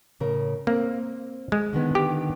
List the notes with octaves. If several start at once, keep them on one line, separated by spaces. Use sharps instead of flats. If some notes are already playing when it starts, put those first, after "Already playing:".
A2 C#3 A#4
A#3 C4
G#3
D3 D#3 B3
G4